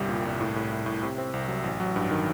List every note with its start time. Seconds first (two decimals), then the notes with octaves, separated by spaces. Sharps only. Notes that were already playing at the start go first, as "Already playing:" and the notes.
Already playing: G1 C2 G3
0.09 A#2
0.25 C2
0.41 A2
0.56 A2
0.72 A2
0.86 A2
1.03 C3
1.18 C4
1.33 C2
1.48 F#3
1.64 A1
1.80 F#3
1.96 G2
2.11 D#3